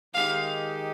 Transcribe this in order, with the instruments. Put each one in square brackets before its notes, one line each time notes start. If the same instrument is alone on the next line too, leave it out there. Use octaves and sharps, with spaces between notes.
[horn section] D#3 G#3 D#4 G4 [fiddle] F5